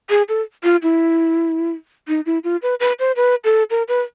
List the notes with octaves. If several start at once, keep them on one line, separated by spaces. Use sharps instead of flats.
G#4
A4
F4
E4
D#4
E4
F4
B4
B4
C5
B4
A4
A#4
B4